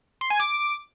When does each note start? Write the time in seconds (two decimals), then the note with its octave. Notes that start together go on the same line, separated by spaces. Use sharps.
0.21 C6
0.30 G#5
0.40 D6